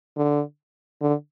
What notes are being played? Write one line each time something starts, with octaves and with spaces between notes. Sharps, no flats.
D3
D3